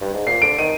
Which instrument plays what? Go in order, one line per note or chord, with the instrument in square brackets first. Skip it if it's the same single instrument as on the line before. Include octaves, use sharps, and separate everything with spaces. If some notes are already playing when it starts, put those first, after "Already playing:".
[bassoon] G2
G#2
[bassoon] A#2 [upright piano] C7
[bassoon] D3 [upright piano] D7
[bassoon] D#3 [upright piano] D#7